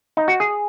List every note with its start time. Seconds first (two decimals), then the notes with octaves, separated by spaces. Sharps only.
0.17 D#4
0.28 F#4
0.40 G#4